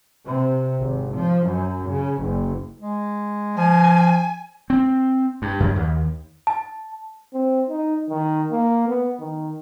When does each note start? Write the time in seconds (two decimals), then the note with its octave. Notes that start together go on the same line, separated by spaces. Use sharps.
0.25 C3
0.80 G#1
1.14 F3
1.47 F#2
1.90 C#3
2.20 F#1
2.80 G#3
3.57 F3 G#5
4.70 C4
5.42 G2
5.60 F#2
5.76 D#2
6.47 A5
7.34 C4
7.70 D#4
8.10 D#3
8.51 A#3
8.88 B3
9.20 D#3